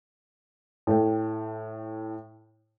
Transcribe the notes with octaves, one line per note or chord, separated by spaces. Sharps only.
A2 A4 G5